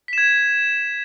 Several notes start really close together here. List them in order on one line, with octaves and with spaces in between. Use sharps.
B6 E7 G#6